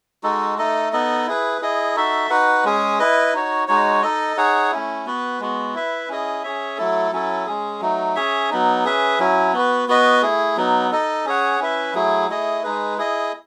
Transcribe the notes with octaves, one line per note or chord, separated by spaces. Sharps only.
G#3 D#4 F#4 A4
A3 D#4 A4 D#5
B3 D#4 A4 D#5
E4 G#4 B4
E4 G#4 D#5
D#4 F#4 A4 E5
D#4 F#4 B4 F#5
G#3 C#4 G#4
E4 B4 D#5
D#4 F#4 C#5
G#3 D#4 F#4 C#5
D#4 A4 D#5
D#4 G#4 C#5 F#5
A3 C#4 E4
B3 F#4 B4
G#3 B3 F#4
E4 B4 E5
C#4 E4 G#4 D#5
C#4 G#4 C#5 E5
F#3 A3 E4 A4
F#3 C#4 E4 A4
G#3 C#4 G#4
F#3 A3 D#4
C#4 G#4 C#5 E5
F#3 B3 D#4
C#4 G#4 B4 E5
F#3 C#4 E4
B3 F#4 B4
B3 F#4 B4 D#5
A3 E4 G#4
F#3 B3 D#4
D#4 A4 D#5
C#4 G#4 C#5 F#5
C#4 E4 B4 E5
F#3 A3 E4 G#4
A3 E4 G#4 D#5
G#3 D#4 G#4 B4
E4 G#4 D#5